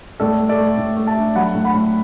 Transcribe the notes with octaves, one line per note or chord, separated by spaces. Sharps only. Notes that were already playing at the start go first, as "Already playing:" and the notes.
A2 A4 D5
A3
A4 D5
A3
A2
A3
E5 A5
D4
F#3 F#5 B5
A2
F#5 B5
A2